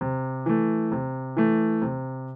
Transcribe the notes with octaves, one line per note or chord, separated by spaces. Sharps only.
C3
E3 A3
C3
E3 A3
C3